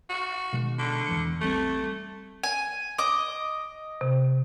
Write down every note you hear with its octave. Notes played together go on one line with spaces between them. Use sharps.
F#4
B2 D#3 G#3
D3
E2 E3 C#7
A#1 G3 A3 C4
G#5
D#5 D6
C3